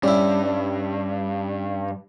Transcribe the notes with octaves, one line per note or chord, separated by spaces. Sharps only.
G2 G3 C#4 E4